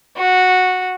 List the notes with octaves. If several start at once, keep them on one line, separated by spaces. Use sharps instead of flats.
F#4